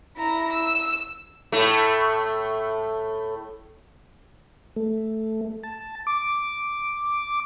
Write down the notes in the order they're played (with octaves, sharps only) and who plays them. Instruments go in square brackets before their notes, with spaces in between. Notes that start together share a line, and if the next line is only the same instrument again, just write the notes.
[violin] E4 A#5
E6
[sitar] A2 A3
[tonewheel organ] A3
A5
D6